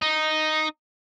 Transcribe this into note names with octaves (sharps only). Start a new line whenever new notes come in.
D#4